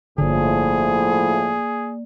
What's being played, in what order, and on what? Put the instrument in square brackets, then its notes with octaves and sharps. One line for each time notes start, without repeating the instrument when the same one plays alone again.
[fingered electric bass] G1 D3 [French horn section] A2 F3 [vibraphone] A#3 D5 [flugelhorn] G#4